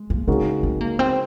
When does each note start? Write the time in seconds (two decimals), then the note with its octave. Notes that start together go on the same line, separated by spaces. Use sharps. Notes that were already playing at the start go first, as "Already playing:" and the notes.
Already playing: G#3
0.10 A#3
0.27 C#3 G#3 C4 D#4 F#4 A#4
0.63 C4
0.81 A#3
0.99 C4